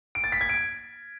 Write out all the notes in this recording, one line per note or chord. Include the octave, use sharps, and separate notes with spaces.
D7
A6
B6
G#6
D7